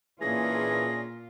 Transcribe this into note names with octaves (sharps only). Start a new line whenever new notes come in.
A#2 E3 C#4 D4 F4 G#4 A#6